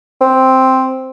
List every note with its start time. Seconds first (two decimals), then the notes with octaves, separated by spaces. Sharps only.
0.21 C4